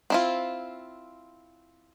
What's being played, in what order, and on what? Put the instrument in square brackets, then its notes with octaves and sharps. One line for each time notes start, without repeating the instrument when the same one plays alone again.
[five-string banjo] C4 E4 F4